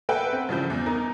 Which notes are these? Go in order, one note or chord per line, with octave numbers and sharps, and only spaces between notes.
A#3 A4 B4 E5 F#5 G5
C4
G2 C#3 E3 F3 G6
E2
D#4 A#4